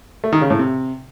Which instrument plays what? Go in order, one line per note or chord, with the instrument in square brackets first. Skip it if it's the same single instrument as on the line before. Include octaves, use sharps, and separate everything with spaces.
[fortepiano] A3
D#3
C#3
A2
C3